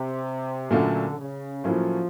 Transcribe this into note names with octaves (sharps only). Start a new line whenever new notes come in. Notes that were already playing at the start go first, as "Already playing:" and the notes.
Already playing: C3
A#2 D3 F#3 A3 C#4 F4
C#3
A2 F3 F#3 A#3 C#4 F4